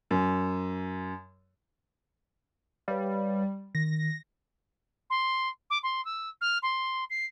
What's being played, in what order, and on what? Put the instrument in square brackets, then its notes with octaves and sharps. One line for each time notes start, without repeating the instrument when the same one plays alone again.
[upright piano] F#2
[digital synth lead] G3 [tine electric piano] B4 C#5 F5
[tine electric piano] D#3 [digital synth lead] A#6
[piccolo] C6
D6
C6
E6
F6
C6
C7